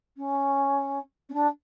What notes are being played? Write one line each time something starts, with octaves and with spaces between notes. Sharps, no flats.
C#4
C#4
D4